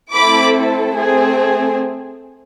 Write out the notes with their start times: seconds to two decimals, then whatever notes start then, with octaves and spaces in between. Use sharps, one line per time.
0.13 A3 C4 E4 A4 B5 D6
0.94 A3 C4 G#4